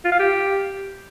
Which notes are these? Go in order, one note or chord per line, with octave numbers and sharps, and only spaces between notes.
F4
F5
G4